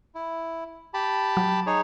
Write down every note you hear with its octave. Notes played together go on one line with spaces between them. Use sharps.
E4
G4 A5 B5
F#3
D#4 G#4 C#5